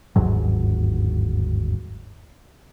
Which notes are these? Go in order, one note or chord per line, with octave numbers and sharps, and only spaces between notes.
G1 D#2 G#2 F#3